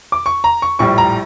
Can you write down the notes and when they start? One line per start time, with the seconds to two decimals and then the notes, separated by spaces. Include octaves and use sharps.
0.12 D6
0.26 C#6
0.44 A#5
0.62 C#6
0.79 A#1 A2 G3 C#6
0.98 A#5